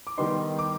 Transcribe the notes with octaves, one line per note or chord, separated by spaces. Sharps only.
D6
D#3 G3 B3 D#4 C6
D6